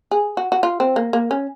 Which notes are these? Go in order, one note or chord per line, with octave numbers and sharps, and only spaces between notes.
G#4
F#4
F#4
F4
C4
A#3
A#3
C#4